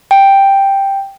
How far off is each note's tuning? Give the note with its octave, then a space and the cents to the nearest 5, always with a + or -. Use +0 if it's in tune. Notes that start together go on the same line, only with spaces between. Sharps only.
G5 +5